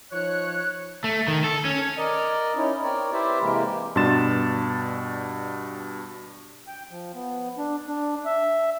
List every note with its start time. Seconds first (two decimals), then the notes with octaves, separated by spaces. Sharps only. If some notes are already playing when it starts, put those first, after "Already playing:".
0.11 F3 D#4 C#5 F#6
1.04 A3
1.28 D#3
1.44 A4
1.65 C#4
1.98 A#4 D5 D#5
2.56 C#4 D#4 E4
2.83 C4 A#4 C#5 D5
3.12 E4 G4 B4 C5 D5 E5
3.41 C3 E3 G#3 A#3 G4 A#4
3.96 G2 B2 D4 C6 A6 E7
6.68 G5
6.91 F3
7.15 B3
7.58 D4
7.87 D4
8.25 E5